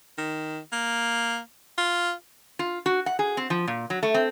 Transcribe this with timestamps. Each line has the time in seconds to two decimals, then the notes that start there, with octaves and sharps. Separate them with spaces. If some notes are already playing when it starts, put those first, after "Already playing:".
0.18 D#3
0.72 A#3
1.78 F4
2.59 F4
2.86 F#4
3.06 F#5
3.19 G#4
3.37 C4
3.50 F3
3.67 A#2
3.90 F#3
4.03 A3
4.14 C4